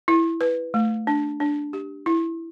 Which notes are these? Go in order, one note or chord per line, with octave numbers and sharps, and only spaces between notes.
E4
B4
A3
D4
D4
G4
E4